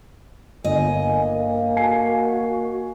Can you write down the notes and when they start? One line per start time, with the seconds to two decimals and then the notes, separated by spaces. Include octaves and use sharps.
0.64 G1 A#3 D#5 G#5
1.77 F#4 G#5 C7